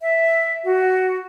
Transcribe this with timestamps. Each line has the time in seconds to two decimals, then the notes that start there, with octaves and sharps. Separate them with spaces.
0.02 E5
0.64 F#4